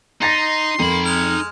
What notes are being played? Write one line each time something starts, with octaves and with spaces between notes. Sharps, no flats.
D#4 A#5 C6 A6 A#6
F2 A#3 D#4 B5
G#3 F6